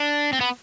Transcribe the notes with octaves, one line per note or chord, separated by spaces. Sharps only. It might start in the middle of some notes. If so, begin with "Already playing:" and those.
Already playing: D4
C4
B3